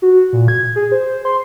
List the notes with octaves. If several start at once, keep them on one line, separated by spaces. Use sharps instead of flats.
F#4
A#2
G#6
G#4
C5
C6